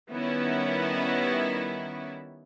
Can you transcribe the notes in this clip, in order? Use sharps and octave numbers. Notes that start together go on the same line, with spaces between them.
D#3 G3 B3 C#4 E4